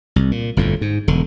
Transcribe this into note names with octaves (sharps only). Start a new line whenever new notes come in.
C2
A#2
G1 F2 A2
G#2
E1 D3